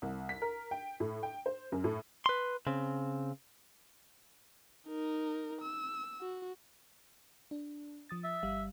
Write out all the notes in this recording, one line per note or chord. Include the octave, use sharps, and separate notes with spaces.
C2
B6
A#4
G5
A2
G5
C5
F#2
A2
B4 C6
C#3 C4
D#4 A#4
E6
F#4
D4
F3 D#6 A6
E5
G1 G3 F5